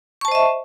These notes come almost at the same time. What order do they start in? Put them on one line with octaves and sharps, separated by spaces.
C#6 A5 C5 D#5 E5